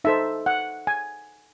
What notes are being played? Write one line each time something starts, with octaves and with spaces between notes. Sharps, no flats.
D#4 A4 C5 E5
F#5
G#5